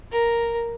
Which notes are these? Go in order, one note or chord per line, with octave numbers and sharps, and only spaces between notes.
A#4